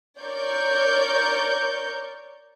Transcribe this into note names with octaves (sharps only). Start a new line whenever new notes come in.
A#4 C#5 D5 C#6 G6